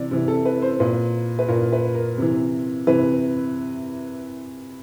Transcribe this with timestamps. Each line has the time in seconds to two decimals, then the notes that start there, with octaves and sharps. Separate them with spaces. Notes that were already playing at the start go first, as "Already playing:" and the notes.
Already playing: C3 E3 D5
0.11 C3 E3
0.28 A4
0.45 B4
0.62 C5
0.80 A#2 B4
1.39 B4
1.48 A#2 A#4
1.72 B4
1.94 A#4
2.18 C3 E3
2.87 C3 E3 B4